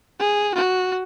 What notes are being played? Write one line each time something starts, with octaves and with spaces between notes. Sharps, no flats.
G#4
F#4